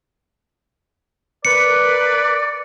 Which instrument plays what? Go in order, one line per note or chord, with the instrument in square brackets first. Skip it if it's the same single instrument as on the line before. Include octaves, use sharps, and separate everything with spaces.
[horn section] A#4 B4 [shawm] D5 [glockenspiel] C#7